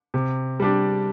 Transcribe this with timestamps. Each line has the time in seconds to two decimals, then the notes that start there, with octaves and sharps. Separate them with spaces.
0.14 C3
0.60 G3 D4 G4